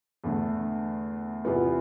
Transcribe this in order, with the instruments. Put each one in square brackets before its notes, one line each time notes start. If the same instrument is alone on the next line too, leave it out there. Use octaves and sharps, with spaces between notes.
[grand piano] E2 D3 A3
E2 C3 E3 B3 F4